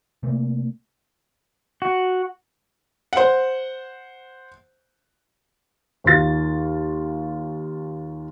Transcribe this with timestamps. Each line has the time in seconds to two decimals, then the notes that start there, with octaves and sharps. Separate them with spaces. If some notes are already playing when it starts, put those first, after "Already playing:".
0.23 C3 A3 A#3
1.82 F#4
3.13 C5 F#5
6.04 D#2 D#4 F4 A6